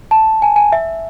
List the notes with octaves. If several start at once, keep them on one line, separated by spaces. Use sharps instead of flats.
A5
G#5
G#5
E5